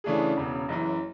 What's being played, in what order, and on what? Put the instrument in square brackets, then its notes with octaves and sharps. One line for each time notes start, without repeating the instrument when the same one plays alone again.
[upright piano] C#3 E3 A3 D4 G#4
E1 E2 C#3
F#1 F#2 E3